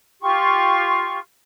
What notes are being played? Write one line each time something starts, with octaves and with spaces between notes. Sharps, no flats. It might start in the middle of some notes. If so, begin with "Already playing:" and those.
F4 G4 C6 C#6